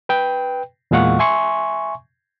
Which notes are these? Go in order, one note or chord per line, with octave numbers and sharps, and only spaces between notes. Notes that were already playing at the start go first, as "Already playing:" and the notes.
B4 G5
E2 A#2 G#3 F5 F#5 C#6
E5 G#5 C6 C#6